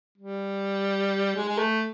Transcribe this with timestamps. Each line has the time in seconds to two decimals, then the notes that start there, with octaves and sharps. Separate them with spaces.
0.18 G3
1.36 G#3
1.49 G#3
1.58 A3